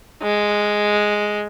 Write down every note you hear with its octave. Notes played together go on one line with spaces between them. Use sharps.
G#3